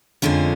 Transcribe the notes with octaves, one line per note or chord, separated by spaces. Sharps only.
F2 D3 G#3 C#4 F4